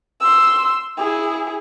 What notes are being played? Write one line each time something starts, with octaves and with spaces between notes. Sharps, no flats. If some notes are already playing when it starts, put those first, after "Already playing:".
C6 E6
E4 G#4